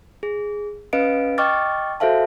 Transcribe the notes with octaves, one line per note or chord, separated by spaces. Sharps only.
G#4
C#4 B4 D#5 F5 D7
D#5 G5 C#6 D6 F6 A6
F#4 A4 C5 E5 F5 A5